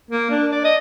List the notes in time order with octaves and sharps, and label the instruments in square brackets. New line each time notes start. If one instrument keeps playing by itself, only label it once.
[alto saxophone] A#3
D4
D5
D#5